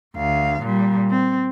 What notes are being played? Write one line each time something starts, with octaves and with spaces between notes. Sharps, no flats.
D2 F5
A#2 G3
C4